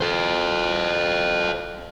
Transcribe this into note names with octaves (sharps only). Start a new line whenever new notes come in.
A4 C5